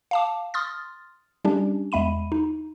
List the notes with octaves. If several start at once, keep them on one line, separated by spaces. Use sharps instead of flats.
F5 A5 D6
C6 D#6 F6 A6
G3 C#4 D4 G4
E2 G#3 E5 B5 D#7
D#4